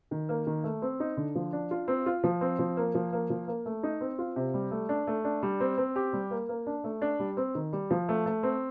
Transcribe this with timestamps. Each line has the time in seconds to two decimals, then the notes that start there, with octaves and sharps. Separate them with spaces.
0.11 D#3
0.29 A#3
0.47 D#3
0.64 A3
0.82 C4
1.00 D#4
1.17 D3
1.35 F3
1.53 D4
1.71 F4
1.88 C4
2.06 F4
2.24 F3
2.41 C4
2.59 F3
2.77 A#3
2.95 F3
3.13 A#3
3.30 F3
3.47 A#3
3.66 A3
3.83 D#4
4.01 C4
4.19 F4
4.36 C3
4.54 G3
4.71 A3
4.89 D4
5.07 A3
5.24 D4
5.43 G3
5.60 C4
5.78 C4
5.96 G4
6.13 G3
6.31 A#3
6.49 A#3
6.66 D4
6.84 A3
7.02 D4
7.19 G3
7.37 C4
7.55 D#3
7.73 G3
7.91 F3
8.09 A3
8.26 A3
8.43 C4